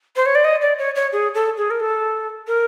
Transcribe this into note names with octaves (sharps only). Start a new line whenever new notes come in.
C5
C#5
D5
D#5
D5
C#5
C#5
G#4
A4
G#4
A#4
A4
A#4